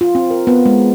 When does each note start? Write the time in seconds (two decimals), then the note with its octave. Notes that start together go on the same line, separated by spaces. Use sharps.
0.01 F4
0.15 C4
0.31 A#4
0.47 B3
0.66 G#3